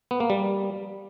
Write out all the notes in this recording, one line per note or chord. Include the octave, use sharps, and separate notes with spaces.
B3
A#3
G3